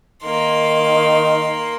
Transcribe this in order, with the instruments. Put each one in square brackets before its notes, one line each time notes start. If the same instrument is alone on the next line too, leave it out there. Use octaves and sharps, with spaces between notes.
[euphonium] D#3 [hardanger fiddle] A#3 C6